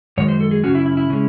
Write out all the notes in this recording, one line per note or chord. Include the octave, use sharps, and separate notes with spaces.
F#2 D#3 G#3 C#5
C5
A4
G#4
F#2 C#3 G#3 C#4 F#4
E4
E4
E4
C#3 G#3 C#4